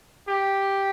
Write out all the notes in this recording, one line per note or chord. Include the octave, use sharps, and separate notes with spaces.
G4